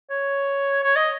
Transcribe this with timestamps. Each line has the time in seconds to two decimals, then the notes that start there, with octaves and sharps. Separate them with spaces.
0.10 C#5
0.83 C#5
0.96 D#5